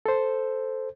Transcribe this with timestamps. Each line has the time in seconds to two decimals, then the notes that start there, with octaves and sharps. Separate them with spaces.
0.06 A4 C5